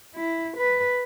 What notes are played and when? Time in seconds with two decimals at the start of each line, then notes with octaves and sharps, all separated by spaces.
0.15 E4
0.57 B4